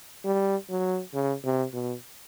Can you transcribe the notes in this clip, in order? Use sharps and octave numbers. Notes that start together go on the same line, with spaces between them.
G3
F#3
C#3
C3
B2